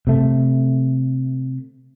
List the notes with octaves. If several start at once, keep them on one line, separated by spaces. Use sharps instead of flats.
C3 A3